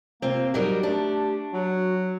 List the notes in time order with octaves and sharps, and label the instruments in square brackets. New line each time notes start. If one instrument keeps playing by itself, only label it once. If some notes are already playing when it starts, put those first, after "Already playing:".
[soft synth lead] C3 [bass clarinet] A#3 [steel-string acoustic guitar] C4 F4
[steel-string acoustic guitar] F#3 G3 A#4 [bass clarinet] D#4 [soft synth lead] G4
[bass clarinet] A3 [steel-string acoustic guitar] D4
[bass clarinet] F#3 [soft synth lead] F#4